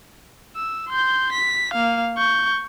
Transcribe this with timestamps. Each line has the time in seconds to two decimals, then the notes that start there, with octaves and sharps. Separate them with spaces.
0.56 E6
0.89 C6 G6
1.32 B6
1.73 A#3 F5
2.17 C#6 G6